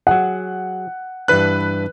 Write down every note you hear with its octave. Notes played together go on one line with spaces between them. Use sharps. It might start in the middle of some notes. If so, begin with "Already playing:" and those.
F#3 G#4 F#5
G2 E3 D4 B4 F#6